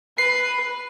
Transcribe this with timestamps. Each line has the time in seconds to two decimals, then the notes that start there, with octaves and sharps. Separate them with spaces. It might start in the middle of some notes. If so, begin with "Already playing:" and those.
0.18 B4 C7